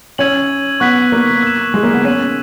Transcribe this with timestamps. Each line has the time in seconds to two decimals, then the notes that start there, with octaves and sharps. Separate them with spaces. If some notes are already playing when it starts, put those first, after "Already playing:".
0.18 C#4 E6 G#6 D#7 F#7
0.80 B3 C#6 F#6 B6
1.12 A#3
1.42 E6 B6 E7
1.74 G#3
1.83 A#3
1.94 B3
2.04 C#4 F#6 B6 D#7 F#7